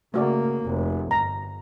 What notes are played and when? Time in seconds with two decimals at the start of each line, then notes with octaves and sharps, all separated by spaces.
0.14 C#3 A3 A#3 F#4 D5
0.64 F1
1.11 G1 A#5